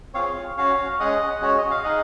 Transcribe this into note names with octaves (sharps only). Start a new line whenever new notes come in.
C4 F4 G#4 C#5 F5
C#4 F#4 C#5 F5
G#3 C#4 G#4 D#5 F#5
G#3 C#4 F#4 C#5
D#5
F5
D#4 G#4 D#5 F#5